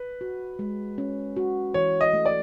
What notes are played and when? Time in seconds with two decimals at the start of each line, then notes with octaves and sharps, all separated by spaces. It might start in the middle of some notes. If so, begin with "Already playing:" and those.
Already playing: B4
0.21 F#4
0.59 G#3
0.98 C#4
1.36 F#4
1.74 E3 C#5
2.01 D#5
2.13 A3
2.25 D5